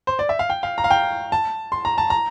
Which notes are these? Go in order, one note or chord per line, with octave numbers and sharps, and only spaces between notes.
C5
D5
E5
F5
G5
F5
A#5
F5
G5
A5
C6
A#5
A5
A#5